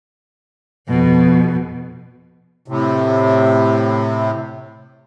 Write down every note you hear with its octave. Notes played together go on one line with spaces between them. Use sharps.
F2 B2
A2 C3